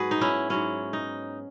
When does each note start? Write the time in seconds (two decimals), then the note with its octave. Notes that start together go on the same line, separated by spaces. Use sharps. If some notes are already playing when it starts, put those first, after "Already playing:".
Already playing: G#2 F#3 B3 F#4 G#4 B4
0.11 D#4
0.21 C#4 E4
0.50 G#2 F#3 B3 C#4
0.93 D#4